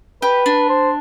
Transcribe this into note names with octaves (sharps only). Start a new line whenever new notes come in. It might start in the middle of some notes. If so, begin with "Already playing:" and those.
G4 B4
D4
C5